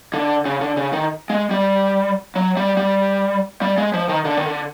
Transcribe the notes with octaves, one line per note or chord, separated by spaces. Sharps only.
D3
C#3
D3
C#3
D#3
G#3
G3
F#3
G3
G3
G3
G#3
F3
D#3
D3
D#3
D3